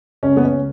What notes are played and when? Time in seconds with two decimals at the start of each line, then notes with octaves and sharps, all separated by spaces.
0.23 C#2 C#4
0.37 B3
0.44 C#2 C#4